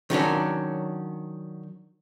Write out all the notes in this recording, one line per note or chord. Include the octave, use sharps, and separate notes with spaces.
D#3 F#3 C#4 D4